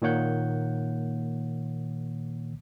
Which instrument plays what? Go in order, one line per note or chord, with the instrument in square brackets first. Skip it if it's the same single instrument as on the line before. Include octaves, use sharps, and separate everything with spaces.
[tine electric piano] A#2 D#3 A#3 C#5 F#5 G6